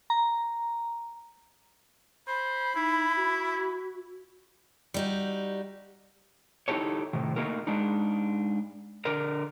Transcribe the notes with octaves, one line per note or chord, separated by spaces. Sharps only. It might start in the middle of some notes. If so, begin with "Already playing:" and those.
A#5
C5 B5
D#4 E4
F#4
G3 D#4 F#4
D#4 E4 G4 A4 C#5
A2 C3 D#3
A3 A#3 D#4 F#4 A#4
G#3 D4 D#4
D3 A#4 D5